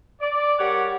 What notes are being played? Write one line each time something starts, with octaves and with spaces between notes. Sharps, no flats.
D5
G3 G4 A#4 C#5 F#5